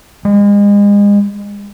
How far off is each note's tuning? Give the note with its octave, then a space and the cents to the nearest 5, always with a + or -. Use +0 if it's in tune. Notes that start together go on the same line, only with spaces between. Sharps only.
G#3 -35